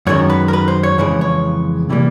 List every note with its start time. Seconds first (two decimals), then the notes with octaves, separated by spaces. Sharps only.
0.07 F#2 D#3 G#3 C#5
0.30 B4
0.48 A#4
0.53 B4
0.68 C5
0.83 C#5
0.98 F2 C#3 E3 G#3 C#5
1.21 C#5
1.89 C3 E3 G3 A#3